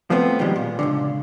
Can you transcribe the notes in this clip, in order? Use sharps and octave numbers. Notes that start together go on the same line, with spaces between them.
F3 A3 B3 C4
B2 D#3 F3 G3 G#3
A#2
C#2 G2 D3